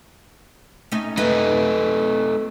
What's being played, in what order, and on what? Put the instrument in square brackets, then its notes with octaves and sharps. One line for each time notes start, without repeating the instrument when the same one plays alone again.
[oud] A3 C#4 D#4
[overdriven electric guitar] A3 D#4 [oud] B4 D#5